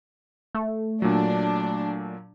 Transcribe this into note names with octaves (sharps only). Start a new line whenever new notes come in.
A3
A#2 F#3 D4